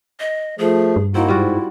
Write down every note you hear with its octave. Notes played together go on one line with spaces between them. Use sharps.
D#5
F3 A3 G#4
G2
A#3 C4 D#4 E4 F#4
G#2 G3 F4 F#4